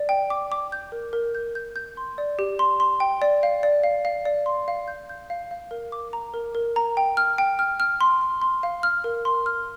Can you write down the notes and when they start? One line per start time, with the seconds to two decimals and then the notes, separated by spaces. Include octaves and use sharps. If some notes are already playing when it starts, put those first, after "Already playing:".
Already playing: D5
0.09 G5
0.30 D6
0.52 D6
0.72 G6
0.92 A#4
1.13 A#4
1.35 G6
1.55 G6
1.76 G6
1.97 C6
2.18 D5
2.39 G4
2.59 C6
2.80 C6
3.00 G5
3.22 D5
3.43 F5
3.63 D5
3.83 F5
4.05 F5
4.25 D5
4.46 C6
4.68 F5
4.88 G6
5.09 G6
5.30 F5
5.51 F5
5.71 A#4
5.92 D6
6.13 A#5
6.34 A#4
6.55 A#4
6.76 A#5
6.97 G5
7.17 F6
7.38 G5
7.59 F6
7.80 F6
8.01 C6
8.21 C6
8.42 C6
8.63 F5
8.83 F6
9.04 A#4
9.25 C6
9.46 F6